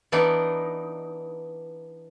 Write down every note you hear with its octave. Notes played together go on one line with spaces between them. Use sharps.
E3 B3 D4 D#4